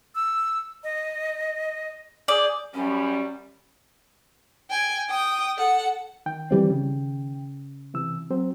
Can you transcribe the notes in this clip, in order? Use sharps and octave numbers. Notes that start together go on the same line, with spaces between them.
E6
D#5
G#4 D5 D#6 G6
F#2 G3 C#4
G5 G#5
G5 D#6
A4 F#5
D#3 G5
E3 G3 C4
C#3
C3 E3 E6
F#3 C4 C5